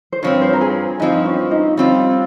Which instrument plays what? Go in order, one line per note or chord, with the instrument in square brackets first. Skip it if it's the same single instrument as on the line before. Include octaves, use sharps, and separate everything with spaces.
[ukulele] C5
[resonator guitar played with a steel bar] G2 F3 C4 [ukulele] C#5
[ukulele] C5
A#4
G#4
[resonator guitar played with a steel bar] G2 F3 C4 [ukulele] D#4
[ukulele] C#4
D#4
[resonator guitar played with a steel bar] G3 C4 F4 [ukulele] C#4